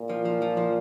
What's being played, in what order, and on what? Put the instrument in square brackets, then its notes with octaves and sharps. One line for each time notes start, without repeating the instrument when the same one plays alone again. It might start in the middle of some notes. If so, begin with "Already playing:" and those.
Already playing: [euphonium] A#2
[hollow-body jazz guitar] F3
F3
F3
F3